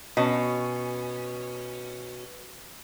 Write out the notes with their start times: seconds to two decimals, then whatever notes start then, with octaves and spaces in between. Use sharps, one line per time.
0.17 B2 C#4